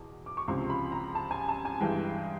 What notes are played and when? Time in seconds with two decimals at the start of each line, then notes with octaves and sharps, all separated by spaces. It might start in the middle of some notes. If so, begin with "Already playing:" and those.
Already playing: E2 B2
0.26 D6
0.37 C#6
0.48 C#2 C3 F3 C6
0.70 B5
0.92 A#5
1.15 A5
1.31 G#5
1.48 A5
1.65 G#5
1.81 G2 E3 G#3 G5